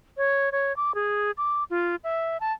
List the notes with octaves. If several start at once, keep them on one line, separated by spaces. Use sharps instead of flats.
C#5
C#5
D6
G#4
D6
F4
E5
A5